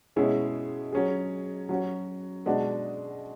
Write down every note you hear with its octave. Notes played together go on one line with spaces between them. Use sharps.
B2 G#3 C#4 E4 G#4
F#3 C#4 G#4
F#3 C#4 F#4
B2 G#3 D4 F#4